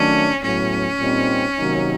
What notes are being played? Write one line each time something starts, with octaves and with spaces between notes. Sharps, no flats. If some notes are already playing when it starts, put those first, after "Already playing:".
Already playing: D#3 F#3 A3 C#4 D4
A2 F#3 B3 C#4
A#2 G3 C4 D#4
C3 D#3 F#3 A#3 D#4